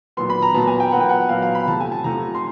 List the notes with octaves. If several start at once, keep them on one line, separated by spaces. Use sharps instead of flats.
A#2 F#3 B3 C6
B5
A#5
A#2 F#3 B3 A5
G#5
G5
A#2 F#3 B3 F#5
G5
F#5
A#2 F#3 B3 F5
F5
B5
C3 F3 A3 A5
G#5
A5
C3 F3 A3 A#5
C6